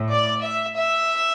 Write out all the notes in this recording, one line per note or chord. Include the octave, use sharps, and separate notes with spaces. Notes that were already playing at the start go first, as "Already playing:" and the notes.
Already playing: A2
D5
E5
E5